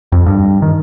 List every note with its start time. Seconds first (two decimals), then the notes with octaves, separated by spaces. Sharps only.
0.12 F2
0.26 G2
0.62 D#3